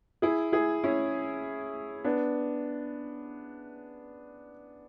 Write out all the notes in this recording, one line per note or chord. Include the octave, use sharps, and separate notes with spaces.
E4 G#4
E4 G#4
C#4 E4
B3 D4